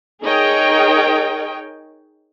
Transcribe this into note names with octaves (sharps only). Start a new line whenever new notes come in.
D#4 G#4 A#4 C#5 D#5 G5